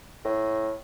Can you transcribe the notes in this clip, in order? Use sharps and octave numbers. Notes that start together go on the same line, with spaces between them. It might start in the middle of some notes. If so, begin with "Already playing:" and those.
A2